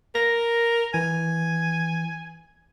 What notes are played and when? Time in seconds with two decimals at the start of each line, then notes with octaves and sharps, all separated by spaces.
0.15 A#4 A#6
0.94 E3 G#5